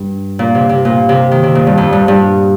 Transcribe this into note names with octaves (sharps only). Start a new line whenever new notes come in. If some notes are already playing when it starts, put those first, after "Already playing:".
Already playing: G2
A#2
C3
C3
A#2
C3
D#3
C3
A#2
G2
F2
G2
G2